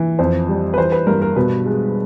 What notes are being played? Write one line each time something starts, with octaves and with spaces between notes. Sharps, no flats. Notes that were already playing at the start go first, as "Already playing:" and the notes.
Already playing: E3
F2 C5
G3
B4
E3 C5
B4
G2 A#4
A#4
B2 B4
G#3